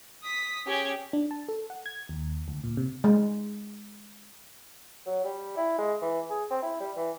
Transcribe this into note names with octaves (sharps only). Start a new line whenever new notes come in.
D#6 B6
C#4 G4 G#4 G#6
D4
A5
A4
F#5
G#6
D#2
D2
A#2
C3
G#3
F#3
G3
E4
G#3
E3
G#4
C4
E4
G3
E3